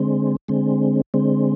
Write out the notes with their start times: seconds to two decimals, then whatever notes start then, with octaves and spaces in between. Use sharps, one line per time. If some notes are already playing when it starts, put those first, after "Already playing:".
Already playing: D3 G#3 C4
0.48 D3 G#3 C4
1.14 D3 G#3 C4